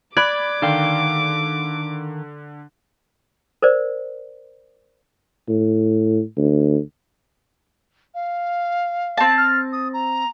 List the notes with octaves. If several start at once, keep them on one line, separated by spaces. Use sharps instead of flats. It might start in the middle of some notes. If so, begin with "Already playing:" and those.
D5 B5 D6 F#6 G#6
D3 D#3 F5 G5
A#4 C5 D5
A2
D2
F5
C4 A5
F6
D#6
A#5